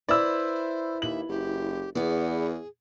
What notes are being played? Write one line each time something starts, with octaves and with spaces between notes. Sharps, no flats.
E4 B4 C5 D5 E6
D#2 E5 F#7
F#1 G4
E2 B3 G#4 D5